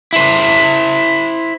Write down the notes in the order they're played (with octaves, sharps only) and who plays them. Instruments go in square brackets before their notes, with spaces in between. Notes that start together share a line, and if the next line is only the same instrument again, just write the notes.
[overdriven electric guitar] E4 C5